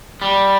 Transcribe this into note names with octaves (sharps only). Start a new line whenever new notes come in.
G3